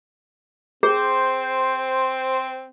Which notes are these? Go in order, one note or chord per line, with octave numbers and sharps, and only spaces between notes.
C4 G#4 C5